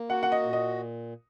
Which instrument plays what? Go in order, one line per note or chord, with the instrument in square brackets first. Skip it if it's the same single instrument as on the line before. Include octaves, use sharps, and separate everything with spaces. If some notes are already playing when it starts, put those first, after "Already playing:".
Already playing: [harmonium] A#3
[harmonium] F#4 [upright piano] F#5
[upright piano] F#5
D#5
[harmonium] A#2
[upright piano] D#5